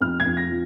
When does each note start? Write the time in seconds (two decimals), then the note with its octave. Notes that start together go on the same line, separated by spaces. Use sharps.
0.01 F2 F6
0.20 G#6
0.26 F2
0.37 A#6
0.50 F3